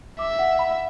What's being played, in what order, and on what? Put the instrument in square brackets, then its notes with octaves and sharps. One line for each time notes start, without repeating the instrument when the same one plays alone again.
[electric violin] E5 [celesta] D6
[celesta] F#5
B5